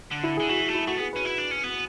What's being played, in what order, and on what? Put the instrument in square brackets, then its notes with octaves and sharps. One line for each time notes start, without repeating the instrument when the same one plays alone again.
[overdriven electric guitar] D3
[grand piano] E4
G#4
[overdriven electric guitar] D3
[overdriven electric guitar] E3 [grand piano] F#4
[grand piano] F#4
[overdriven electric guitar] A3
[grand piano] E4
[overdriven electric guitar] A3 [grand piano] F#4
[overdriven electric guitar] B3 [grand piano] G#4
[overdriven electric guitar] C#4 [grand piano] B4
[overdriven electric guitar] E4
D4
C#4
B3